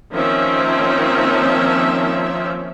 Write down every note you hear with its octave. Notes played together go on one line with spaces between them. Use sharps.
D#3 F3 A#3 C4 C#4 E5